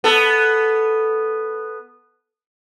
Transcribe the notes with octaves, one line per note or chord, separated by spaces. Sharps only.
B3 A4